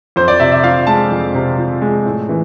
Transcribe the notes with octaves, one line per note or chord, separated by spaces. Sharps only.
F2 C5
D5
C3 E5
E5
F3 F5
G#3 A5
F2
C3
F3
G#3
A2
E3